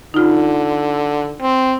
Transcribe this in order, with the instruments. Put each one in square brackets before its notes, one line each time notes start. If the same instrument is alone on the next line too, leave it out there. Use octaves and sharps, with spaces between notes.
[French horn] D3 [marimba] D#4 F4
[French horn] C4